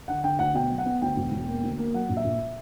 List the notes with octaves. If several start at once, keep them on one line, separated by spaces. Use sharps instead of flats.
D3 F#5
D3 G5
D2 F#5
B2 G5
F#3
F#5
B3
D2 G5
E1
E1
A#3
D2
A#3
F#3 F#5
A#1
E5
A#1